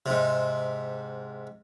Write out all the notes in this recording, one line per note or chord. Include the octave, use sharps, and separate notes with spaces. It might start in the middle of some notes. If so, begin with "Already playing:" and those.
G#2 C3